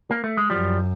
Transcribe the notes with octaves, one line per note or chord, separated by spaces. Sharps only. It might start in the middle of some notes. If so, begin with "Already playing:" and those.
A#3
A3
G#3
F#2 F3 G3